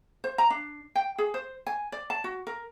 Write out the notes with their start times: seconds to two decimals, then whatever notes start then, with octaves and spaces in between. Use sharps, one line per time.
0.24 C5
0.38 A#5
0.50 D4
0.95 G5
1.18 G#4
1.34 C5
1.67 G#5
1.92 D5
2.10 A5
2.24 F#4
2.47 A#4